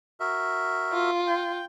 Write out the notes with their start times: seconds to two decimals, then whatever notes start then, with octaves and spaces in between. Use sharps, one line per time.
0.20 F#4 A#4 E5
0.93 F4
1.27 G5